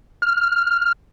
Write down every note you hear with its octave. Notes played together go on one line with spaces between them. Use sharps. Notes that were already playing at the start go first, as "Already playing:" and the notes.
F6